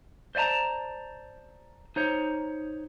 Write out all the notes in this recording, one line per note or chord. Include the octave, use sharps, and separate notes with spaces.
C5 D5 D#5 A5 A#5
D#4 C5 C#5